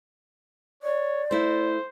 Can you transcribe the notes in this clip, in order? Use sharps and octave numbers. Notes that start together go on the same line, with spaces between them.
C#5 D5
A3 E4 C5